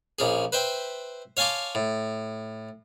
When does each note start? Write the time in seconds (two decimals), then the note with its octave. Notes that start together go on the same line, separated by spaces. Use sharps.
0.19 A#1 C#4 G#4
0.52 B4 C5 E5 G5
1.37 C#5 F5 G#5 A5 C6 D6
1.75 A2